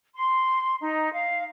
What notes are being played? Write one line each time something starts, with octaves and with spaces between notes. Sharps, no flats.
C6
D#4
F5